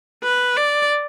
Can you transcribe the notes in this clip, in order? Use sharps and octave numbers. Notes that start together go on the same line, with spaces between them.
B4
D5